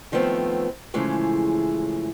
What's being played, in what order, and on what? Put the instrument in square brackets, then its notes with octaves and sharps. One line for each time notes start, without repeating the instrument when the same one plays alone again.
[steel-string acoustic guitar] D#3 F3 A3 B3 C4
A2 C#3 E3 F3 G#3 A3